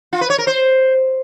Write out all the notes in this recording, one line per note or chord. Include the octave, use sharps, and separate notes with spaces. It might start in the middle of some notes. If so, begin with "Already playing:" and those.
F4
B4
C#5
A#4
C5